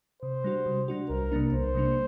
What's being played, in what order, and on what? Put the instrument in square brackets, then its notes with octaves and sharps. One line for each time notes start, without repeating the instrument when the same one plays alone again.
[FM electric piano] C3 [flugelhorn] C5
[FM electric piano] G3 D4 F#4
C3
G3 D4 F#4
[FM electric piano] C2 [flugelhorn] A#4
[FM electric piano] C3 G3 A#3 D4
[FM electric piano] C2 [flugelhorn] C5
[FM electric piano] C3 G3 A#3 D4